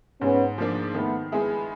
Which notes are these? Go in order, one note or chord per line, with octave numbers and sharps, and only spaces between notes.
G#2 B3 C#4
F3 A#3 D4
D#3 A3 B3
G#3 B3 E4 G#4